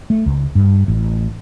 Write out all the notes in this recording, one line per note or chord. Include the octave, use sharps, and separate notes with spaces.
A3
C#2
G2
A1